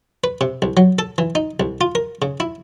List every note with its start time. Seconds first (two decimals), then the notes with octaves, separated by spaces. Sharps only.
0.24 B4
0.41 C3
0.62 C2
0.77 F#3
0.99 A4
1.18 E3
1.35 D#4
1.60 C2
1.81 F4
1.95 A#4
2.22 C#3
2.40 E4